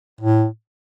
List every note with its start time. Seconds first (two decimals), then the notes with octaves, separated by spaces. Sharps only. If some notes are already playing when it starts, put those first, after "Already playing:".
0.21 A2